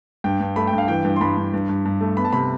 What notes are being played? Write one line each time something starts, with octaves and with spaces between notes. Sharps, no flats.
G2 G5
G2
A3 B5
G5
G2
F5
E3 G5
G2
C6
G2 B5
G2
G2
G2
G2
A3
B3 B5
A5
C3 B5